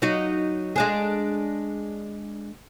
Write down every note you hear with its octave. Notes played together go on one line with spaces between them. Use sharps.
F#3 D#4 F#4
G#3 D4 G#4